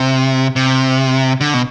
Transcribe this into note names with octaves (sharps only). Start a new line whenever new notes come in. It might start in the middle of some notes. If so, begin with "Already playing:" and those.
Already playing: C3
C3
D3
B2